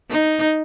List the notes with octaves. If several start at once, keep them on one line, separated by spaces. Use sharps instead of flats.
D#4